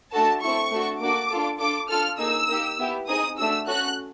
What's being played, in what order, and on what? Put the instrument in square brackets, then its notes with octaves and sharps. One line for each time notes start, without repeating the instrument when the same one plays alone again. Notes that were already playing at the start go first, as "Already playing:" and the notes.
[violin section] A3 D4 F#4 A4 A5
C4 E4 A4 C#6
A3 D4 F#4 A4
A#3 D4 F#4 A4 D6
D4 F4 A4
D4 F4 A4 D6
D4 F4 A4 F6
A#3 D#4 G#4 E6
A#3 D#4 G4
B3 E4 G4
C4 D#4 G#4 D#6
A3 D4 F#4 E6
C#4 F#4 A4 F#6